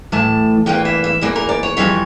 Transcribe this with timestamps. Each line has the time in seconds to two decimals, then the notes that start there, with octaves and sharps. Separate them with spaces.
0.12 A2 E3 A3 A5
0.66 E2 E3 A#3 G5
0.85 E5
1.04 E5
1.21 E2 E3 A#3 D5
1.36 A#4
1.49 D5
1.63 C#5
1.77 F2 E3 G3 C#5